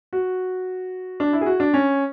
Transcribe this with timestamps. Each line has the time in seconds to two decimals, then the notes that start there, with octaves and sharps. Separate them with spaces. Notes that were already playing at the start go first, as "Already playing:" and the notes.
0.13 F#4
1.20 D4
1.33 E4
1.41 G#4
1.46 F#4
1.60 D4
1.74 C#4